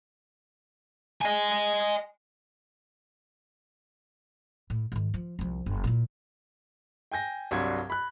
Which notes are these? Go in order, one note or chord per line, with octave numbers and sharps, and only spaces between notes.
D#5 G#5
A2
G#2 D#3
F3
C2 F3
F#1
A#2 E4
G5 G#5 G6 A#6
C2 G2 F#3 C6 G#6
B5 F#6